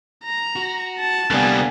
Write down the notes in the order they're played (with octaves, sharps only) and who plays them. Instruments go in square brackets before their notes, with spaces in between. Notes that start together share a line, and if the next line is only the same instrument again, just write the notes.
[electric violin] A#5
[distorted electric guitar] F#4
[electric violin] A5
[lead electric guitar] C2 G3 [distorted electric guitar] D3 A#3 [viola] B3 G#5